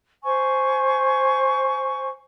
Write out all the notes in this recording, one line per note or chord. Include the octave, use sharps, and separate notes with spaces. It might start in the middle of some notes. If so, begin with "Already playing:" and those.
C5 G#5 C#6